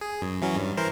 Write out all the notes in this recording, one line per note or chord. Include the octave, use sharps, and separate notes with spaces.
G#4
F#2
E3 F#3 C#4
G2
E3 A#4 C5